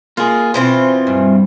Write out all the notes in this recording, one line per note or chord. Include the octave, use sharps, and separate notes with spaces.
A#3 F4 G#4
B2 E3 C4 F4 C5
G2